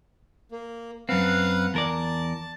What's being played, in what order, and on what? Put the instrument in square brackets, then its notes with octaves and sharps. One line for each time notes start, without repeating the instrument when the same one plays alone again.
[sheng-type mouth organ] A#3
[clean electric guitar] F#2 C4 [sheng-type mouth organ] B4 F5 F#5
[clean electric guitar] E2 A#4 D5 [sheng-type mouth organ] A5